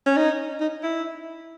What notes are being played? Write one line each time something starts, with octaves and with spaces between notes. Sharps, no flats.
C#4
D#4
D#4
E4